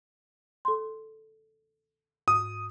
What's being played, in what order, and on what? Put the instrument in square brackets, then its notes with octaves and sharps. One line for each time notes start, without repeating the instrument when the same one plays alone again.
[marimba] A4 C6
[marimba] G#2 [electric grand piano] D#6